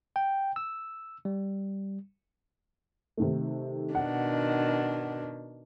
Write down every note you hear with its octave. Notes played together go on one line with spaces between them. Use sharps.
G5
E6
G3
C3 D#3 A3
B2 D#3 D4 F#5